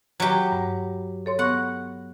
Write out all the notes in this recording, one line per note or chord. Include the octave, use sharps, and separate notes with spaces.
F#3 G4
G2
A4 C#5 C6
B3 F#5 C#6 A#6